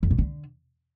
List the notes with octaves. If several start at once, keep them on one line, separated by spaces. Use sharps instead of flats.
F2
A#2
D3